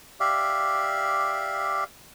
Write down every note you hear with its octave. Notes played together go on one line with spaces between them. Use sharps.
G4 D5 E5 F5